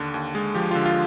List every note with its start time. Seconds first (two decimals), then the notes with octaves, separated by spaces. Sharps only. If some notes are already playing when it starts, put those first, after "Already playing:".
Already playing: D#2 D3
0.14 D#2
0.35 G#3
0.55 F3 G4
0.71 D3 F4
0.85 F4